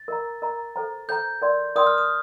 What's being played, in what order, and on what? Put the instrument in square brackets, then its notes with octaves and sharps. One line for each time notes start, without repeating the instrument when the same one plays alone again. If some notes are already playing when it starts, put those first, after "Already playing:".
Already playing: [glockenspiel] A6
[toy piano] A#4 D#5 A#5
A#4 D#5 A#5
A4 C5 G5 A#5
[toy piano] A4 C5 G5 A#5 [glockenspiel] G6
[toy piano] A#4 D5 G5 C6
[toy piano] A#4 D5 G5 C6 [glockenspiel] D#6
[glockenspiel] F6
D#6